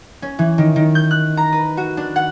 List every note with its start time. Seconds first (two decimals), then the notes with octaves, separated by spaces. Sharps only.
0.22 C#4
0.39 E3
0.58 D#3
0.76 D#3
0.95 G6
1.11 F#6
1.37 A#5
1.52 B4
1.77 F#4
1.97 D4
2.16 F#5